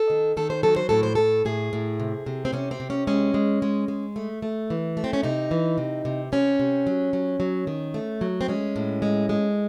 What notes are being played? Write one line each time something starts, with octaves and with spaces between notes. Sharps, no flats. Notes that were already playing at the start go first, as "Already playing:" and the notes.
Already playing: A4
D#3
D#3 A4
C5
F#3 A4
C5
A2 A4
C5
A2 A4
A2 G#4
A2
C3
C3
C4
C3 C#4
C4
C3
C#4
G#3 C#4
G#3
G#3
G#3
A3
A3
E3
A3
C4
C#4
C3 D#4
E3
C3
C3
C3 C#4
C3
F#3
F#3
F#3
D#3
A3
F#3
C4
G#3 C#4
A2
G#3
G#3